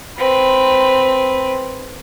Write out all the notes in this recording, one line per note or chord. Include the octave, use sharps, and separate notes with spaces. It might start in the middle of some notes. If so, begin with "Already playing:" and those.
C4 B4